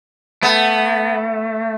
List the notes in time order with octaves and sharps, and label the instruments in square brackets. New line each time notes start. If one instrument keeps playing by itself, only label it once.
[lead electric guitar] A3 [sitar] B3